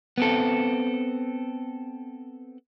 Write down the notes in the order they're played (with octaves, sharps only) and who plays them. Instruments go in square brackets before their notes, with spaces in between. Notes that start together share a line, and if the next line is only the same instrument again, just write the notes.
[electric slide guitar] B3 C4 A4